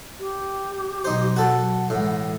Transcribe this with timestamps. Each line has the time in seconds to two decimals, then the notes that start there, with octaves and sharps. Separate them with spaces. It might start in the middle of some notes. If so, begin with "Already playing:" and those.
0.20 G4
1.05 B2 F#3 D#4 C5
1.36 F#3 F#4 A4 F#5
1.90 A2 E3 G#3